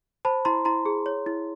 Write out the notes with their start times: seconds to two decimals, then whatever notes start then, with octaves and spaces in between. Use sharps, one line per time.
0.25 C5 A5 B5
0.45 E4 A#5 C6
0.65 E4 A#5 C6
0.86 G#4
1.06 C#5
1.26 E4